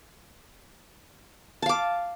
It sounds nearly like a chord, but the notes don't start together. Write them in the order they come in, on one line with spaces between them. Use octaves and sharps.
A5 F5 D6